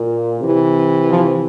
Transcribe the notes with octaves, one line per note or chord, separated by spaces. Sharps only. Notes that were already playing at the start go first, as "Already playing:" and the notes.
Already playing: A#2
C3 E3
F3